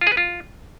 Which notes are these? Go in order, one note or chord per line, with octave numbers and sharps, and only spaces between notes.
F4
G#4
B4
F4